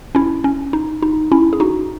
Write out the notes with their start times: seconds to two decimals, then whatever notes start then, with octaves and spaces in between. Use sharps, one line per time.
0.15 C#4 E4
0.44 C#4
0.73 D#4
1.02 D#4
1.32 C#4 E4
1.53 G#4
1.60 D#4 F#4